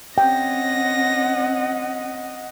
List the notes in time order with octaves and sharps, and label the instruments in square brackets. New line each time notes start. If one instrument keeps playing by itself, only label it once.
[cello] C4 C#4 [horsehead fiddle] D#5 F#5 [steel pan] G5 [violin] A#6